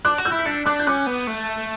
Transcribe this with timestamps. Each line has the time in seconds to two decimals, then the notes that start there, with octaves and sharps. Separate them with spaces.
0.05 D4 D6 F#6
0.18 F#4
0.25 E6 G6
0.32 E4
0.39 B6
0.45 D4 A6 C#7
0.66 D4 D6 F#6
0.79 G6
0.87 C#4 D6 F#6
1.07 B3
1.27 A3